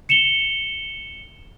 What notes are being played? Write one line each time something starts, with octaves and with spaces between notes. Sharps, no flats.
C#7 E7 F7 G7